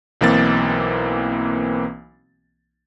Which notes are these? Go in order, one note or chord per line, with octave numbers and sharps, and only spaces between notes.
B1 E3 A#3 C4 A6